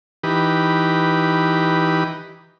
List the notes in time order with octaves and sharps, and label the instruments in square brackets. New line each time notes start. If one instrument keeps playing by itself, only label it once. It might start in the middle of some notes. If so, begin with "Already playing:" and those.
[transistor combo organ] E3 D#4 G4 B4